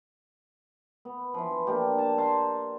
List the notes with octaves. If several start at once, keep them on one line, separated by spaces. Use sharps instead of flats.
B3
E3 F3
A#3 D4 G4
A5
F5 A5 A#5 C6